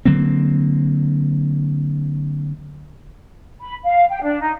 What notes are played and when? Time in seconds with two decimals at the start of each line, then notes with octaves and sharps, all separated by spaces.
0.05 D3 F#3 A#3 C4
3.60 B5
3.83 F5
4.09 G5
4.22 D4
4.40 D#4